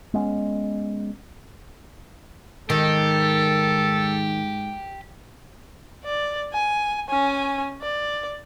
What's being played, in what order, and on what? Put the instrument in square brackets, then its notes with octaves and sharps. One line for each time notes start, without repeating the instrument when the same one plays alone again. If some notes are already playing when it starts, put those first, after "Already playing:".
[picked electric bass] G#3 B3 C#4
[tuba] G#2 [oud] D#3 [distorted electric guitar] G4 [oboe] A4
[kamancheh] D5
G#5
C#4 G#5
D5